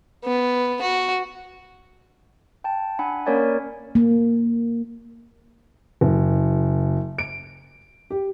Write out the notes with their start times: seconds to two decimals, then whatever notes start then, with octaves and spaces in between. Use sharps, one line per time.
0.24 B3
0.82 F#4
2.64 G5 A5
2.99 D4 F#5 G#5 B5
3.26 A#3 C#4 A#4 C#5 D5 G#5
3.95 A#3
6.01 F#1
7.18 D7
8.10 G4